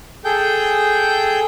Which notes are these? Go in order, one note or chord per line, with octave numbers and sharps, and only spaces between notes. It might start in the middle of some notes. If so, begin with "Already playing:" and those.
G#4 A4 G5 G6